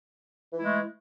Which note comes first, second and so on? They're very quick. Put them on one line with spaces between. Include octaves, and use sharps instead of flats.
E3 E4 G#3 A3